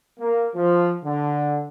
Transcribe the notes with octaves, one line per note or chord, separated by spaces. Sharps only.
A#3
F3
D3